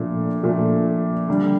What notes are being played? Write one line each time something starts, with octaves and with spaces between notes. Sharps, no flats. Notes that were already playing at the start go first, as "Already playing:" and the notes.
Already playing: A#2 F3 A3 D4
A#2 F3 A3 D4
D3 G3 D4